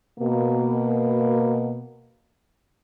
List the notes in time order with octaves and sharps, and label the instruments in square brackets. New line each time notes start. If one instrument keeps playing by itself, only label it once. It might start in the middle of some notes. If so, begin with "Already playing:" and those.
[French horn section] B2 A#3